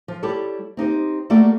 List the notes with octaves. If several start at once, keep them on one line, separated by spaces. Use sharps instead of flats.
F3
G3 E4 G4 A4 C#5
C4 D#4 G4 C5
G3 A3 A#3 F#4 A4 D5